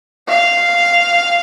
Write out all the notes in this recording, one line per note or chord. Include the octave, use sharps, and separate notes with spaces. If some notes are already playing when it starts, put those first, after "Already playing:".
F5